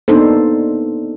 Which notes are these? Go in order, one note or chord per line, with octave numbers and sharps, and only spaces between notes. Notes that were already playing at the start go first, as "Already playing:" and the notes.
A#3 B3 D4 D#4 A4 C5